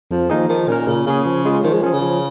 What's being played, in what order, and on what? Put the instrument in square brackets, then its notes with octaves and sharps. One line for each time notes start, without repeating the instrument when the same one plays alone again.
[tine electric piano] F2 [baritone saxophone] F3
[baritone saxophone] D#3 [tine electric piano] F3 A#3 D#4 G#4
[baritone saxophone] D#3 [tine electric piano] F3
[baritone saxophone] A#2 [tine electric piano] C#4 A#4
[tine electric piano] A#2 [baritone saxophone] C#3
[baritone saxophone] C#3 [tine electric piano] A#3 C#4 G#4
[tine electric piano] F3
G#3 F4 G#4
[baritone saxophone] D#3 [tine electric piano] F3
[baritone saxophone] G#3
[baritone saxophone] F3 [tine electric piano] C#4 G#4
[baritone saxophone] C#3
[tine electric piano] F3